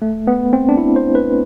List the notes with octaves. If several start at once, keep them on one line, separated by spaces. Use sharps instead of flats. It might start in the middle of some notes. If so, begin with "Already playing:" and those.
A3
B3
C4
D4
E4
C5
B4